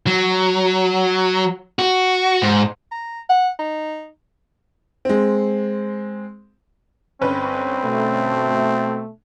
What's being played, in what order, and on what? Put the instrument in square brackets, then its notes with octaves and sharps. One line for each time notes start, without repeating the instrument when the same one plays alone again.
[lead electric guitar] F#3
F#4
G#2
[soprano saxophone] A#5
F#5
D#4
[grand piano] G#3 C4
[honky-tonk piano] G1 C#4 B4 [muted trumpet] C4
[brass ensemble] B2 A3